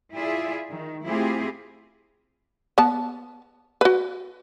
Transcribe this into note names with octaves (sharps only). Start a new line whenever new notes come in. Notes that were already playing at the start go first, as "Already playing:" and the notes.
E4 F4 G#4 D5 E5
D#3
A3 C4 E4 F4 G4 G#4
B3 A5
F#4 B4